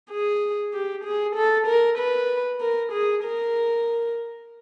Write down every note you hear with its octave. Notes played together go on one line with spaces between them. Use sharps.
G#4
G4
G#4
A4
A#4
B4
A#4
G#4
A#4